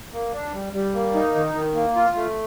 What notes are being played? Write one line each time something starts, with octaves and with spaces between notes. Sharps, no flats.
A#3
D4
G3
G3
A#3
D#4
D#3
D#3
A#3
F4
A3